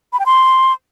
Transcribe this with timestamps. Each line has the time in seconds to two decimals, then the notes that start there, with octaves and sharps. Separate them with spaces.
0.13 B5
0.19 G5
0.26 C6